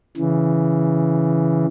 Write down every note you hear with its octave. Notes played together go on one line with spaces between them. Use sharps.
C#3 E3